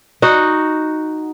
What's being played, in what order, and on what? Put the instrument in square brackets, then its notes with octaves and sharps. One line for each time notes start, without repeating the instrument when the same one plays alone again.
[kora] D#4 F#4 F#5